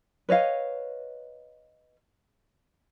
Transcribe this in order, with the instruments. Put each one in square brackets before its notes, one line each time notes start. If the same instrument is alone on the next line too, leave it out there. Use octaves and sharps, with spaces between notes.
[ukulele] B4 C#5 D#5 F5